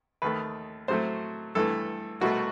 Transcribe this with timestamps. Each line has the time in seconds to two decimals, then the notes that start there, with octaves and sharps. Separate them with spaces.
0.22 D#2 D#3 A3 B4
0.88 A2 F#3 A3 C5
1.55 G2 E3 A3 A4
2.21 C2 B2 A3 F#4